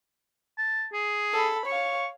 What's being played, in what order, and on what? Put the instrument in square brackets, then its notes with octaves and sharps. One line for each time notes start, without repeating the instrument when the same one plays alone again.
[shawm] A5
G#4
[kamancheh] A4 B5
[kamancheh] C#5 F5 [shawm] C#6